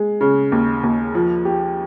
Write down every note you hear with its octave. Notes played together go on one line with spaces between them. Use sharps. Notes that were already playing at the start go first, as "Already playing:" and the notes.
Already playing: G#3
C#3
D#2
D#2
F3
G4